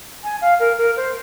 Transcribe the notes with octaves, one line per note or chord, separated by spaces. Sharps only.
G#5
F5
A#4
A#4
C5